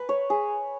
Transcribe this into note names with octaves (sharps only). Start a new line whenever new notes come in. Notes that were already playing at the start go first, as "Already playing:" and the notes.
Already playing: B4
C#5
G#4